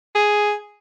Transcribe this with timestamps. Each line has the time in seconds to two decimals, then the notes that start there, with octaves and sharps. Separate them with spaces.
0.15 G#4